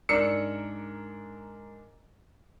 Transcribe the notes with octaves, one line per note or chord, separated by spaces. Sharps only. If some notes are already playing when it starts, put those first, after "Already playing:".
G#2 D4 A#4 E6 C#7